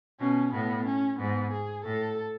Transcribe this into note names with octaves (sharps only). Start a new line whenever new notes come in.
B2 C#4
A2 B3
C#4
G#2 B3
G#4
A2 A4